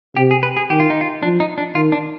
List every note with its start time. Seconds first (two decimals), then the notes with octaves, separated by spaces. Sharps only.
0.16 C3 G4
0.31 G#4
0.43 B4
0.57 G#4
0.70 D#3 G4
0.80 F4
0.90 D#4
1.01 F4
1.23 F3 D4
1.40 D#4
1.58 D4
1.75 D#3 F4
1.92 D4